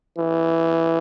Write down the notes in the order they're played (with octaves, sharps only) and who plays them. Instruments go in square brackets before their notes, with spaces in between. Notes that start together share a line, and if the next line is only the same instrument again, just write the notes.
[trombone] E3